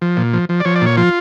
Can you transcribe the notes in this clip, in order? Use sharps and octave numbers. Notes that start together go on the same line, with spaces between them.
F3
A#2
F3
F3
D5
F3 C#5
D5
A#2 C#5
F3 F4